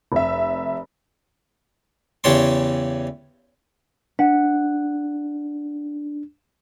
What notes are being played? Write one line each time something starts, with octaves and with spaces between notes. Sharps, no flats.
F1 E5
E2 C#3 G4 C#5 A5 C6
D4 F#5